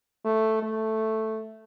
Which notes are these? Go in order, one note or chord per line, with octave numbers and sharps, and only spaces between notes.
A3
A3